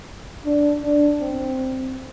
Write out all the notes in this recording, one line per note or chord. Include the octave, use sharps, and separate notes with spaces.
D4
D4
C4